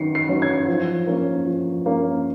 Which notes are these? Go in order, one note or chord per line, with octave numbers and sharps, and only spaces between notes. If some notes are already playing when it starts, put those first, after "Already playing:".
Already playing: D#3 F#3 C#4 C7 C#7
C7
F#3 C#4
G#6
F3
A#3 C#4
F3
A#3 C#4